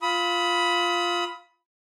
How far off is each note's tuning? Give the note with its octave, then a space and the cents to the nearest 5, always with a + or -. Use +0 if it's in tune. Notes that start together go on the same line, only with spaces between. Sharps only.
F4 +0 B5 +0 D#6 +35